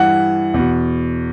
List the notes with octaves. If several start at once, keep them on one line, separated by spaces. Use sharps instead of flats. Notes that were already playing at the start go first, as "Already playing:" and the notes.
Already playing: G2 E3 F#5
E2 B2